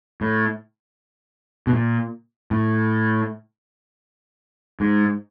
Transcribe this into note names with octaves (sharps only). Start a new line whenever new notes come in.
A2
B2
A#2
A2
G#2